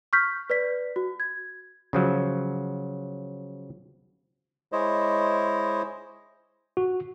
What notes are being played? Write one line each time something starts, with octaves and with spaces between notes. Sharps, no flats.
C#6 F6 G6 B6
B4 D5 B6
F#4
G#6
C#3 F3 F#3
G#3 E4 C5 C#5 D#5
F#4